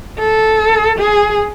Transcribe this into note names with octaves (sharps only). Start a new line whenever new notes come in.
A4
G#4